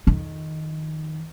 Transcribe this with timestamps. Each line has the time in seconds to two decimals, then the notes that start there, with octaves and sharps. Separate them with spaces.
0.07 F2 D#3